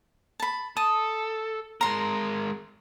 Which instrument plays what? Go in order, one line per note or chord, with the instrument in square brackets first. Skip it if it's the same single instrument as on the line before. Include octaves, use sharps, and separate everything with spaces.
[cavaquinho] A5 B5
[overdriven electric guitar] A4 [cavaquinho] D#6
[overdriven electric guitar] G#3 A#4 [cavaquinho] A#5 C6